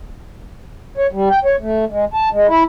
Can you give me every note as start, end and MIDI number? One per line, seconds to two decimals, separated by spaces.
0.97 1.07 73
1.13 1.29 55
1.30 1.39 79
1.45 1.56 73
1.61 1.85 57
1.90 2.05 56
2.14 2.29 81
2.32 2.47 56
2.48 2.63 64